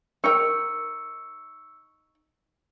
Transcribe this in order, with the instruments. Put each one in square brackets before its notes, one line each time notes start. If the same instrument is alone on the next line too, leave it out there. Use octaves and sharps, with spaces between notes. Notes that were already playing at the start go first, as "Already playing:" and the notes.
[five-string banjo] D#4 A#4 G5 [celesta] C#6 E6 C#7